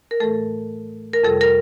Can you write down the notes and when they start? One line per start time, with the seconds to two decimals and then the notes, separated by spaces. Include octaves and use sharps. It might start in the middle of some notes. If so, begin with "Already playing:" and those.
0.11 A#4
0.20 A2 E3 A3 A4
1.13 A#4
1.24 F2 C3 G3 A4
1.41 A#4